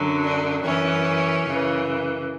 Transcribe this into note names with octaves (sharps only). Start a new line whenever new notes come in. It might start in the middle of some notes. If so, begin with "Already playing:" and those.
Already playing: F#2 D3 F#3
D4
F#2 E3 C#4
F#2 C#3 E3